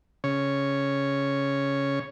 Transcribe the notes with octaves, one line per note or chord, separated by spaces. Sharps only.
C#3 C#5